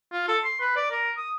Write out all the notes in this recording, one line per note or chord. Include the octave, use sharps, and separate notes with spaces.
F4
A4
C6
B4
D5
A#4
D#6